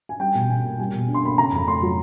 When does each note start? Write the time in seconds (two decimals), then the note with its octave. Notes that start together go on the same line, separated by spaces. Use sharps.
0.09 G#5
0.20 G3 G5
0.35 B2
0.50 B2 G#5
0.65 A#3
0.79 G3 G#5
0.93 B2
1.08 D4
1.14 C6
1.23 A#3 B5
1.38 C#3 A#5
1.52 F2 B5
1.67 A3 C6
1.82 F#3